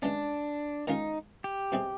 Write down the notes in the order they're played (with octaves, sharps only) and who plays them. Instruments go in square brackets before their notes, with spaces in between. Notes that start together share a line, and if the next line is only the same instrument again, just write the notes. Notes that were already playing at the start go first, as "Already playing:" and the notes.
[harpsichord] E3 G#3 C#4 [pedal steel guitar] D4
[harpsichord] D#3 G#3 C#4 F4 A#4 [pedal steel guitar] D#4
[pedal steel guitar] G4
[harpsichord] B2 G3 C4 E4 G#4